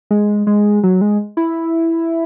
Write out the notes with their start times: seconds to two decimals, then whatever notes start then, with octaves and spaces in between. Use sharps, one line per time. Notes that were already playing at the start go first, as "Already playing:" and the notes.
0.11 G#3
0.47 G#3
0.83 F#3
1.01 G#3
1.37 E4